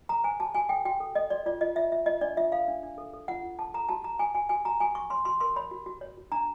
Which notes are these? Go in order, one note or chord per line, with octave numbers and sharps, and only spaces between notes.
A4 A#5
C5 G#5
F#4 A5
F#4 G#5
A4 G5
F#4 G5
A4
A4 D#5
F#4 D5
F4 D5
F4 D#5
F4 E5
F4 E5
F4 D#5
D4 D5
F4 E5
A4 F5
D4
D4
A4
A4
F4 F#5
F4
A4 A5
A4 A#5
F#4 A5
F#4 A#5
F#4 G#5
F#4 G#5
F#4 G#5
F#4 A#5
F#4 G#5
F#4 C#6
C#5 C6
F#4 C6
A#4 C6
C#5 B5
F#4
F#4
C#5
F#4
D4 A#5